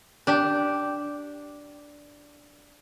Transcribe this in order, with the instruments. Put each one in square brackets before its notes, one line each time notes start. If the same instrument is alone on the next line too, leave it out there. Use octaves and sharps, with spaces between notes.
[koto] D4 G4